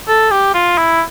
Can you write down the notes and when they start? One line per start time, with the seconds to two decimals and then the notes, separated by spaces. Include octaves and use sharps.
0.08 A4
0.31 G4
0.54 F4
0.78 E4